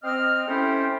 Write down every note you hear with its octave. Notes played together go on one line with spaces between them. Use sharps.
C4 D#5 F6
A3 C#4 E4 G4 C5 G5